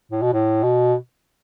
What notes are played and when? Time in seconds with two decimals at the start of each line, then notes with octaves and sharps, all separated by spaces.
0.11 A2
0.22 B2
0.33 A2
0.63 B2